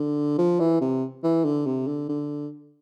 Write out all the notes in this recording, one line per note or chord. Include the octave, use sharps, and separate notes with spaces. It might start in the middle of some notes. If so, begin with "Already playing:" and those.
Already playing: D3
F3
E3
C3
E3
D3
C3
D3
D3